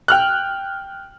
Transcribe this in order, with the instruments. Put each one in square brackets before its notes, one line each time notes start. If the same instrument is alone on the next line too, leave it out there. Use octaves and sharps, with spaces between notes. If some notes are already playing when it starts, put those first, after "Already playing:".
[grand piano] G5 F6 F#6